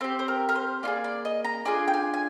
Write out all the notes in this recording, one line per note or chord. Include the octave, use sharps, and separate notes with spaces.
C4 G4 C5
C5
A#4
A#4
C5
A#3 F4 G#4 D5
D5
D#5
A#5
D4 F4 G#4 G#5
G5
G#5
G#5